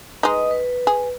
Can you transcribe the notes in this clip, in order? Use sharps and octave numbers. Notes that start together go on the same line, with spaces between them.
G#3 D#4 B4 D#5 D#6
B4
G#4